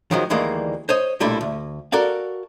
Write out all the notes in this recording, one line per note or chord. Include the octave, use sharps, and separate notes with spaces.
D#3 F3 F#3 G#3
D2 D#3 E3 G3 G#3 A#3
C5 C#5 D#5
B1 A#2 G3 A3 D4 E4
D2
F#4 A4 A#4 D5 F5